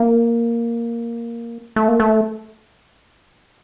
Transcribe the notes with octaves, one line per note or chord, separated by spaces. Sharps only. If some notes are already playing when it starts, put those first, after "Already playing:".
Already playing: A#3
A3
A#3
A3